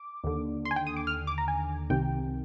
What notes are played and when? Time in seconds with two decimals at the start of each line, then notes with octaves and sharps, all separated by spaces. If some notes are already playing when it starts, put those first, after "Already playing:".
Already playing: D6
0.24 D#2 D3
0.65 C6
0.71 G#5
0.76 G5
0.87 D#6
0.97 D6
1.07 F6
1.27 D6
1.38 A#5
1.48 G#5
1.90 C2 C3 D#3 G5